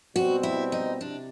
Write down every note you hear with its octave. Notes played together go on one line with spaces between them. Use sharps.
B2 G3 C4 F#4
E4
D#4
C3 D4